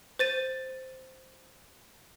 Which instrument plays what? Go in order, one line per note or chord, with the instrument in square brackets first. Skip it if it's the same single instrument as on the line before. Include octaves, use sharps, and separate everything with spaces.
[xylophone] C5 A6 D#7